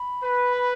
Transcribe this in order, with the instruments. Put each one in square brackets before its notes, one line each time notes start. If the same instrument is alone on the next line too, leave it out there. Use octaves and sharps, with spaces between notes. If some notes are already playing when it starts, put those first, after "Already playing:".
Already playing: [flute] B5
[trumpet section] B4
[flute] B5